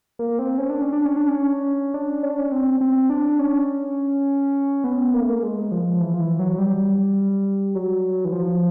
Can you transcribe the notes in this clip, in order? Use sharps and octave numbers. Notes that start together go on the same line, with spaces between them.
A#3
C4
C#4
D4
C#4
D4
C#4
D4
C#4
D4
C#4
D4
C#4
C4
C4
D4
C#4
B3
A#3
A3
A#3
G#3
F3
E3
F3
E3
F#3
G3
F#3
E3
F3